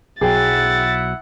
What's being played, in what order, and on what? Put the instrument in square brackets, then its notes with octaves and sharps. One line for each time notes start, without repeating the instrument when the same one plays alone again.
[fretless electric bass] B1 F#3 [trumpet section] E4 E5 F#5 [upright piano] G#4 G5 [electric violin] A6